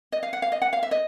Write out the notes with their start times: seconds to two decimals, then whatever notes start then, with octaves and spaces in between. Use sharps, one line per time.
0.12 D#5
0.23 F5
0.33 F#5
0.42 F5
0.52 D#5
0.62 F#5
0.73 F5
0.83 E5
0.91 D#5